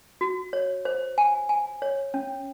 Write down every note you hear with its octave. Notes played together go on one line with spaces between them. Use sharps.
F#4
C#5
C5
G#5
G#5
C#5
C#4